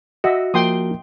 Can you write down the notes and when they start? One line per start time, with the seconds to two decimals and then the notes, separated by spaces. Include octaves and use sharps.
0.24 F#4 D#5 E5
0.54 F3 A#3 A#4 G5 C6 D#6